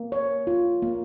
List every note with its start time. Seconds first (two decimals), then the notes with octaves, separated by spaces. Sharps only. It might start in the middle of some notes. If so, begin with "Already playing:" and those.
Already playing: A#3
0.12 C#5
0.47 F4
0.82 A#3